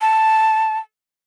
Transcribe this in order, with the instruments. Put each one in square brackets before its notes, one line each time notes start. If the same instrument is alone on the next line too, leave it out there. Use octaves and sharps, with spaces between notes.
[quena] A5